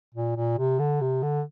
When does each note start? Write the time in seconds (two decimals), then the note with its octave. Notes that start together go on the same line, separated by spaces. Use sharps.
0.14 A#2
0.36 A#2
0.58 C3
0.79 D3
1.01 C3
1.22 D3